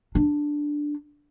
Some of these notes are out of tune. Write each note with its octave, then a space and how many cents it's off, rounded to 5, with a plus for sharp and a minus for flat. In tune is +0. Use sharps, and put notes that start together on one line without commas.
D4 +0